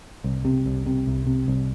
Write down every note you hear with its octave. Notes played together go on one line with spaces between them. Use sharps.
C2
C3
C2
C3
C2
C3
C2